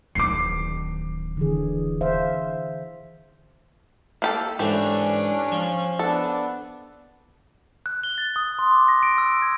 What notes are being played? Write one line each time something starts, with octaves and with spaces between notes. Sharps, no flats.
D1 D#3 D6 C7
D3 E3 G#4
C5 E5 F5
A#3 G4 A4
G#2 E3 A3 C#4 D4 G4
F3
B3 D4 A4
F#6
G7
A6
D#6
C6
D6
A#6
D7
E6
G#6